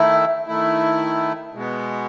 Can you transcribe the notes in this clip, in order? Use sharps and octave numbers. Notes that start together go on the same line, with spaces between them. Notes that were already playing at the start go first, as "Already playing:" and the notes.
Already playing: D#3 A3 E4
D#3 A3 E4
B2 G#3 B3